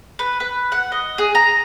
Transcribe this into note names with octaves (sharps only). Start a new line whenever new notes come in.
B4
B4
F#5
D#5
G#4
A#5